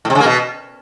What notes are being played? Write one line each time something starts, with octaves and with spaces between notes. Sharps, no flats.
A2
C3
C#3
A#3
B2